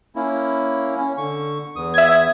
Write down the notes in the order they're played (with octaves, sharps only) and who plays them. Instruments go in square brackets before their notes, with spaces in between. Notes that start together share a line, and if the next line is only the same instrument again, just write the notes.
[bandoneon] A#3 C#4 E4
C#4
D3 C#6
E2 D#6
[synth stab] E5 G#6